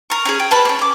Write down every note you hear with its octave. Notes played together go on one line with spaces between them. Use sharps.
A#4 C#6
C#4 F#4 G#4
G5
B4 A5 B5
A#3 C#4
C#4 D6